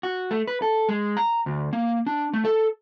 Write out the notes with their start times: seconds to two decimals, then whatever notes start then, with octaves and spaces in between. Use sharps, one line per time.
0.03 F#4
0.31 A3
0.47 B4
0.62 A4
0.89 G#3
1.17 A#5
1.46 D2
1.73 A#3
2.07 D4
2.33 A3
2.45 A4